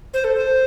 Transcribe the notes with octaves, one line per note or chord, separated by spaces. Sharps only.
C5
A4
C5